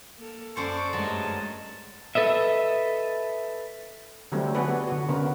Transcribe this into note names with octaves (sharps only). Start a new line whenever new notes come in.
A#3 A4
F#2 A4 C5 D5 A5 C#6
G2 F#3 G#3 A3 A5
A4 B4 D#5 E5
D3 F#3 G3 A3 C4
B3 D4 F#4 G#4 B4
D3 F#4
C#3 B3 A#4